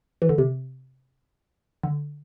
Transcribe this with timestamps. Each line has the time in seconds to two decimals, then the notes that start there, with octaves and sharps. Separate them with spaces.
0.22 E3
0.29 D3
0.38 C3
1.83 D3